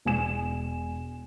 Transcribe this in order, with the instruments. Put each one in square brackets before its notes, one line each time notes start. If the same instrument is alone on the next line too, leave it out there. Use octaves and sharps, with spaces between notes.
[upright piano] E1 G#5 E7